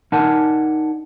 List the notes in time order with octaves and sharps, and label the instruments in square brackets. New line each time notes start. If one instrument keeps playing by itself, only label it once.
[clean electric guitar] D#4 A#4 D5 F#5 G#5 A5